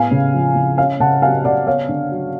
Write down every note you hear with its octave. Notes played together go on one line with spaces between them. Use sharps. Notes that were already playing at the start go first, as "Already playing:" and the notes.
Already playing: A2 B3 F5 G#5
C#3
F3
C#3
C#4 F5 G#5
C#3 F#5 A5
F#3 F5 G#5
C#3 D5 F#5
B3 C#5 F5
D3
F#3